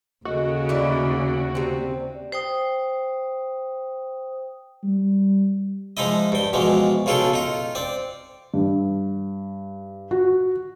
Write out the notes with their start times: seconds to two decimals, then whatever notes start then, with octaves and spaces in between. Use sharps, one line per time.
0.25 D#2 C#3 F#4 A4 D#5
0.69 A#3 E4 D5
1.55 C3 C4
2.32 C5 G5 D#6
4.84 G3
5.97 F3 G#3 D#4 E4 D#5
6.32 G2 G5
6.53 B2 E3 F3 G#3
7.06 B1 C#3 F4 G#4 A4 G5
7.33 D#4 F4
7.75 C4 D5
8.54 G2
10.11 F#4